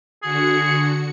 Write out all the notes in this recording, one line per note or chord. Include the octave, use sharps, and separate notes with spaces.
D3 F#4 G#4 C#7